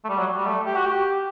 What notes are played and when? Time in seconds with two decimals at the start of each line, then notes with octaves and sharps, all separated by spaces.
0.04 A3
0.09 G3
0.18 F#3
0.37 G3
0.46 A3
0.65 G4
0.76 F#4
0.85 G4